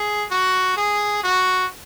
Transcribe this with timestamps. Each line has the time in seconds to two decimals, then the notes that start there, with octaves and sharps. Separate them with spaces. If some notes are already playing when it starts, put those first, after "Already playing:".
Already playing: G#4
0.31 F#4
0.77 G#4
1.24 F#4